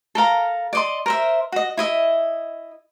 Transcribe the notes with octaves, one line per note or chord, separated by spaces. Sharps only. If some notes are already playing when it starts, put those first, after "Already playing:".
A4 A#4 F5 A#5
D5 D#5 C6
A#4 C5 E5
F#4 D#5
E4 D#5 E5